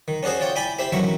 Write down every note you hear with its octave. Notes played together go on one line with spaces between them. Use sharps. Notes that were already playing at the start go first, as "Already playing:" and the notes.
D#3
C#4 D4 F#4 G#4 C5
F4 C#5 D5 G5
E4 D5 G5 G#5 B5 D6
E4 G4 C5 E5
A1 D#3 F#3 A#4 E5 C#6